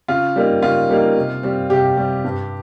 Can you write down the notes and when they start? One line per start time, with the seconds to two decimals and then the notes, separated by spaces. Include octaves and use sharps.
0.08 C#3 F4
0.36 G3 A#3 D#4
0.62 C#3 F4
0.89 G3 A#3 D#4
1.16 C3
1.43 G3 C4
1.70 C3 G4
1.97 G3 C4
2.25 G2